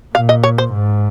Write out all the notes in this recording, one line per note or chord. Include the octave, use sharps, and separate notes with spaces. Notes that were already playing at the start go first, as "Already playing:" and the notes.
A#2 F5
D#5
C#5
C5
G#2